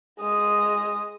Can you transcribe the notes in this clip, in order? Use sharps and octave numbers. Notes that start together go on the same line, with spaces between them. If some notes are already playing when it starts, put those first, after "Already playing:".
G#3 D#6